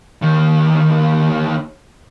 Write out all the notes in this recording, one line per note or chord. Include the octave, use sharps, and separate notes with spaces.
D#2 D#3